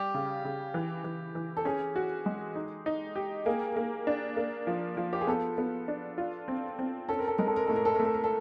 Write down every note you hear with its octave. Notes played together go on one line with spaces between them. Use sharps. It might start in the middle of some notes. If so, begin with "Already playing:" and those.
Already playing: G3 G4
C#3
C#3
E3
E3
E3
A4
C#4 G#4
F#4
G#3
D#4
D#4
G4
A#3 G#4
A#3
D4
A#3
F3
F3
G4
G#4
B3 A4
B3
D4
F4
C4
C4
C#4 A4
A#4
A4
G#3 A#4
A4
A#4
A2 A4
A#4
A4
A#4
A3
A4
A#4
A4